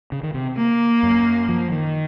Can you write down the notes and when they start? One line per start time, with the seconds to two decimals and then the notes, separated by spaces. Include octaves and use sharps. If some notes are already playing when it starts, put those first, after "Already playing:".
0.12 C#3
0.23 D#3
0.34 C3
0.57 A#3
1.03 F#2
1.49 F3
1.72 D#3